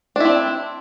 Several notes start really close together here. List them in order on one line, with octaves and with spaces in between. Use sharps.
D4 E4 C4